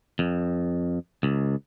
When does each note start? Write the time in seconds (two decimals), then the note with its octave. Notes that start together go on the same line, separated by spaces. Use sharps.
0.19 F2
1.23 C#2